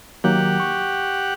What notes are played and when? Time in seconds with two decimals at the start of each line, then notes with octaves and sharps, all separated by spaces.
0.24 D#3 F#3 A#3 G4 F#5
0.60 C#6